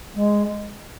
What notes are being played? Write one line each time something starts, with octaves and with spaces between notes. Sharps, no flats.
G#3